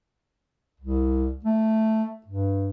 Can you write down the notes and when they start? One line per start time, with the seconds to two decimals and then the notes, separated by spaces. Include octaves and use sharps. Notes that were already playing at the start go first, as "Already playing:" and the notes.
0.80 C2
1.44 A3
2.26 G2